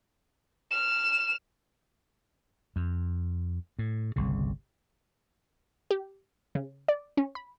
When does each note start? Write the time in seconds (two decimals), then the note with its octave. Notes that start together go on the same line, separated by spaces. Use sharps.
0.71 F6 E7
2.76 F2
3.79 A2
4.16 G1 C2 C#3
5.91 G4
6.55 C#3
6.88 D5
7.17 C#4
7.35 B5